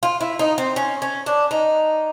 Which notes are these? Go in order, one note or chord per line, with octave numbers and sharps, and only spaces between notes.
F4
E4
D#4
C4
C#4
C#4
D4
D#4